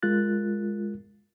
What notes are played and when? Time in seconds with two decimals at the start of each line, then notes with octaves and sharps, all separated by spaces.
0.02 G#3 F4 A#4 F#6 A6